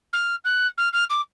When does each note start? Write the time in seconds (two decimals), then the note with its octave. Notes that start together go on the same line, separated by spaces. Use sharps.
0.13 F6
0.44 F#6
0.78 F6
0.93 F6
1.10 D6